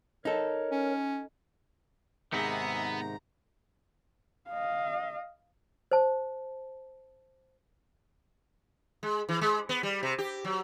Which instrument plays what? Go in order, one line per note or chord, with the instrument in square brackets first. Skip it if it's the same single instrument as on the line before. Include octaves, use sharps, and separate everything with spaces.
[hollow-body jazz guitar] D#4 A4 [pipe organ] A#4 C#5
[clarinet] C#4
[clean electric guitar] G#2 C3 D#3 [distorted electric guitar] B3 [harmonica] G#4 E5 [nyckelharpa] A#5
[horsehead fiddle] D#5 F5
[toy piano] C5 A5
[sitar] G#3
E3
G#3
B3
G3
C3
G4
F#3